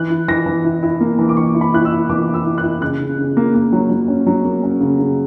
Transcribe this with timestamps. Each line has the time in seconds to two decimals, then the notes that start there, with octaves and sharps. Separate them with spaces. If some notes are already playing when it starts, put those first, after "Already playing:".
Already playing: E3 F#6
0.10 E4
0.28 E3 A#6
0.46 E3
0.65 E4
0.83 E4
1.01 A#3
1.19 E3
1.29 D6
1.37 E3 C#6
1.54 E4
1.61 B5
1.74 E4 F#6
1.85 E6
1.92 E4
2.09 E3 D6
2.28 E4
2.34 E6
2.45 E4
2.58 F#6
2.63 E4
2.81 C#3 F#6
2.99 C#3
3.18 C#3
3.37 A#3
3.54 A#3
3.73 F#3
3.90 F#3
4.08 C#4
4.27 F#3
4.45 A#3
4.63 C#4
4.80 C#3
4.99 C#3